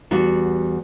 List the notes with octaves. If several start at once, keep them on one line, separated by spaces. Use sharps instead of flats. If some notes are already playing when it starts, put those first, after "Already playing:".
E2 G3 F#4